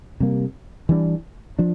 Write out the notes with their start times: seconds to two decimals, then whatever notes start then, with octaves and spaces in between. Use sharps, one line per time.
0.20 C3 G3 A#3
0.89 E3 G3 D4
1.59 F3 D4